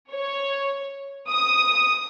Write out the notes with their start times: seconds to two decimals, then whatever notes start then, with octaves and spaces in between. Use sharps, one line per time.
0.12 C#5
1.29 D#6